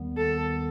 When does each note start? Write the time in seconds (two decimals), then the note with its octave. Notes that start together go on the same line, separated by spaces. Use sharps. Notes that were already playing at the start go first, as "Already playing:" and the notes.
Already playing: D#2 D#3 G3 B3
0.18 A4